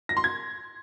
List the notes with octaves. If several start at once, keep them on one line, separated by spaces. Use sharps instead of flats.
A#6
C6
G#6